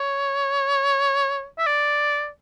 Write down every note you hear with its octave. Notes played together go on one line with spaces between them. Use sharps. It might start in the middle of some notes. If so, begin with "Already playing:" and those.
Already playing: C#5
E5
D5